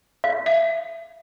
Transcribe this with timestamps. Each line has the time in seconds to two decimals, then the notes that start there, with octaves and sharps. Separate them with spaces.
0.24 F5
0.46 E5